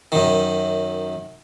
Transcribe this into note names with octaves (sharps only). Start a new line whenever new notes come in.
F#2 D#3